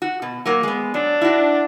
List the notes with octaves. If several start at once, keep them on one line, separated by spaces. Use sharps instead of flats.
F#4
B2
F#3 A#3
G#3 B3
F#3 D4
E4 F#4